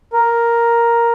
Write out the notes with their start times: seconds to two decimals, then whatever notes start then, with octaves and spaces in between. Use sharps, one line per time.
0.13 A#4